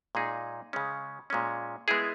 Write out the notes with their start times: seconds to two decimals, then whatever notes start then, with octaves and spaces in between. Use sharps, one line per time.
0.15 A#2 G#3 D#4 G#4
0.73 C#3 G#3 C#4
1.30 A#2 G#3 C#4
1.88 G#3 B3 E4 G#4